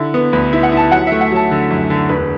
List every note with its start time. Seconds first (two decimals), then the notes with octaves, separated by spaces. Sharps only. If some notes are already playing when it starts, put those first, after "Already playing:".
Already playing: D3 E4
0.14 B3
0.33 D2 B4
0.53 E4
0.63 F#5
0.72 E4 A5
0.92 F#3 F#5
1.07 E5
1.12 A3
1.21 F#5
1.31 F#3 A5
1.51 D3
1.71 F#2
1.90 D3
2.09 E1 B4